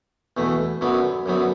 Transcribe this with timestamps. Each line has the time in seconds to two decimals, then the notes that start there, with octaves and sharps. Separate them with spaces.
0.37 E2 B2 A3
0.81 F#2 D3 F#3 B3
1.26 F#2 D3 F#3 B3